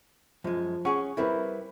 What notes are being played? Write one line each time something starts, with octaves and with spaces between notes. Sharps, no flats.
F#2 F3 G#3
C#4 G#4 F#5 C#6
G3 C4 E4 A#4 B4